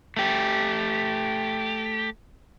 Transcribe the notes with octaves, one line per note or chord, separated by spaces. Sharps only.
A3 G4